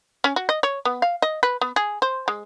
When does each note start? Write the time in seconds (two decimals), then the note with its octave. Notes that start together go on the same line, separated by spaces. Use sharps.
0.24 C#4
0.36 F#4
0.49 D#5
0.63 C#5
0.85 B3
1.02 F5
1.22 D#5
1.43 B4
1.61 B3
1.76 G#4
2.02 C5
2.28 G#3